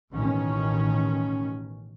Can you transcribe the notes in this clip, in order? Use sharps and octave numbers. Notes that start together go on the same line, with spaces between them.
A1 B2 D#3 C#4